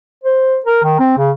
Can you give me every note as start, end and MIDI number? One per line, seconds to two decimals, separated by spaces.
0.24 0.58 72
0.66 0.81 70
0.83 0.95 51
0.99 1.15 60
1.18 1.31 49